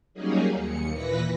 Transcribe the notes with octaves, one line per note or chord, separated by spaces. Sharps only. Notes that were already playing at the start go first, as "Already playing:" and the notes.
F#3 G3 A#3 C#4 D#4 G#4
D#2 C#7
A#2 E3 B4 A#6 B6